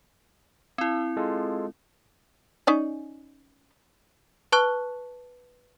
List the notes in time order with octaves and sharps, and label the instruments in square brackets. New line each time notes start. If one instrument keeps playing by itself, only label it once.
[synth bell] C4 E4 [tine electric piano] E6
[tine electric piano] G#3 F4 A4
[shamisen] C#4 D#4 D5
[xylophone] B4 A5 C#6 F#6 G7